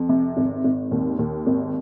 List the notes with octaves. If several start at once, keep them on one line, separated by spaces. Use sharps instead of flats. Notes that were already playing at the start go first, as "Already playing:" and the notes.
Already playing: F2
C3
G#1
G#1
D#2
D#2
G#1